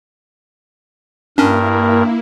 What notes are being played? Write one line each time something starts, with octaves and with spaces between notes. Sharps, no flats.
G2 A#3 C#4 D4 E4 A#4